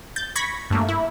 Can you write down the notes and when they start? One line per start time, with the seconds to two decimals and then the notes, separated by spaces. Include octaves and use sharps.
0.16 G6 A6
0.36 B5 C#6 G#6 A#6 B6
0.70 G2 A3 A#3
0.89 E4